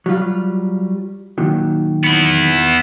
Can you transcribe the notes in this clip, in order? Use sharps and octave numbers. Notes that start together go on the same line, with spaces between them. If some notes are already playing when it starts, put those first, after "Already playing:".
F#3 G3 F4
A#2 D#3 F#3
B3 E4